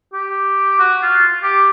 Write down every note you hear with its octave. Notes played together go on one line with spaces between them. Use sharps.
G4
F#4
F4
G4